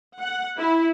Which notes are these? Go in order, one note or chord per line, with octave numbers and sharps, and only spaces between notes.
F#5
E4